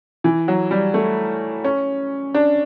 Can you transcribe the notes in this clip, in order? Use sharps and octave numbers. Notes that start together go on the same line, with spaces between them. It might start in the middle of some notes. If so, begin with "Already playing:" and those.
E3
F#3
G3
A3
C#4
D4